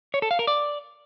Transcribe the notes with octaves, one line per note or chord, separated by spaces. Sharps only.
C#5
A4
F5
A#4
D5